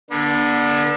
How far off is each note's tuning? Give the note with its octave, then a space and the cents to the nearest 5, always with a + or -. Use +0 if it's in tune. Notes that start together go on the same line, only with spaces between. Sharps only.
D3 +0 B3 -45